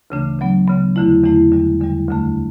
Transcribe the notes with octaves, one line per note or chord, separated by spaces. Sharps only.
D2 C#3 E3 A3 D4
C#3 F#3 B3
C#3 F#3 B3
E2 D3 A3 E4
E2 D3 A3 E4
E2 D3 G3
E2 D3 G3
D2 D3 A3